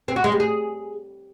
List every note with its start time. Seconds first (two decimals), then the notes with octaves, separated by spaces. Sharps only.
0.08 C4
0.16 F#4
0.24 G#3
0.32 G3
0.40 G#4